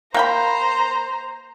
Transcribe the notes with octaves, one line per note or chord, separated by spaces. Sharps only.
A#3 C5 G5 A#5 B5